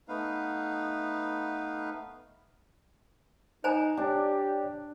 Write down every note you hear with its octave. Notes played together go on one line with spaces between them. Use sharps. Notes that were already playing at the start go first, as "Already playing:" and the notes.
A3 B3 D#4 B4 F5
D#4 C5 G#5 A#5
D4 G4 C#5 D5 G5